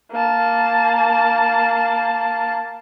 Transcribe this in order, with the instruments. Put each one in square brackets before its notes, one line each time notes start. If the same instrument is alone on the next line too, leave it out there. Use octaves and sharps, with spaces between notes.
[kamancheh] A#3 A5